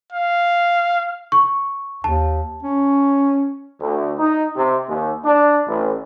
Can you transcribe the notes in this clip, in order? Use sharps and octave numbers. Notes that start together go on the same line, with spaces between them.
F5
C#6
D#2 A5
C#4
D2
D#4
C3
D#2
D4
A1